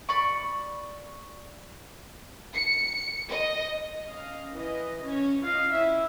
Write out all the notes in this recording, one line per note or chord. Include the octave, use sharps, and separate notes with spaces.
D5 B5 C#6
C#7
D#5
C#4 D#5 F5
E3 D#5
C#4 C#5
F4 D#5 F5
C#4 E4 E5